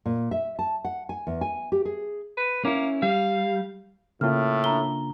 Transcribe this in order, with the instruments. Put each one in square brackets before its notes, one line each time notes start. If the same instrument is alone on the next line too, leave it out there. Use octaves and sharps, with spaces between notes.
[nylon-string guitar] A#2
E5
A5
F#5
G#5
E2
G#5
G4
G#4
[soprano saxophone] B4
[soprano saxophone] A#3 [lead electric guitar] C#4 E4
[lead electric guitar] G3 [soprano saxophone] F5
[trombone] A2 [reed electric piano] C#3 A#3 F4 [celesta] F6
[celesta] D4 A#5 G7